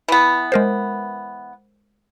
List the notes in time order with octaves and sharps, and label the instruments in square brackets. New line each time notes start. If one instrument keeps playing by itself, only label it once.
[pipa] E3 B3
[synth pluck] G#3 A#4 C5